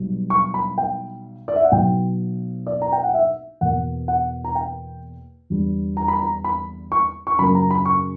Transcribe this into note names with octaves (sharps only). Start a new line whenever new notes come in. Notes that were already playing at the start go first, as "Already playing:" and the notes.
Already playing: B1 B2 G3
C#6
B5
G5
D5
E5
F#5
B1 B2 F#3 B3 G5
D5
A#5
G5
F#5
E5
E2 B2 A#3 F#5
F#5
A#5
G5
E2 D3 G3
A#5
B5
A#5
B5
C#6
C#6
F#2 C#3 F#3 A#3 B5
A#5
B5
C#6